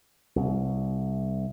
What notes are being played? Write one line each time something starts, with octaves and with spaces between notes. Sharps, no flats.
C2